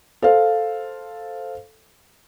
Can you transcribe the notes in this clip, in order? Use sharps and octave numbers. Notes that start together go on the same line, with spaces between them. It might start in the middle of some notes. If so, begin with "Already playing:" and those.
A4 C5 F5